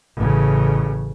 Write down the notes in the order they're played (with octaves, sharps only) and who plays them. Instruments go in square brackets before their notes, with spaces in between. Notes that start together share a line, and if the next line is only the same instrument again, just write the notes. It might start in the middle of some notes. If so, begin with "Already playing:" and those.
[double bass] A1 C#3